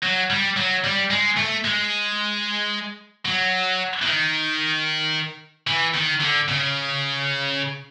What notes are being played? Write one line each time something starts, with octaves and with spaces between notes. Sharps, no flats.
F#3
G3
F#3
G3
G#3
A3
G#3
F#3
E3
D#3
E3
D#3
D3
C#3